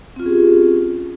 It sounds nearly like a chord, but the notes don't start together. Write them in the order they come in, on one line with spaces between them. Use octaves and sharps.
C4 F4 C#4 G#4 G4